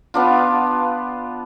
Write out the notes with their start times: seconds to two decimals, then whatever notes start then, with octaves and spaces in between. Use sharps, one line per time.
0.14 B3 D4 F4